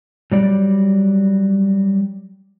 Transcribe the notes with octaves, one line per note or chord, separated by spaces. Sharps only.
F#3 G3 D5